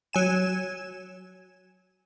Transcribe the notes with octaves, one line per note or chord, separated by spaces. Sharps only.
F#3 G#5 E7